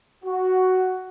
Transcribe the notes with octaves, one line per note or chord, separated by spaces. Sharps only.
F#4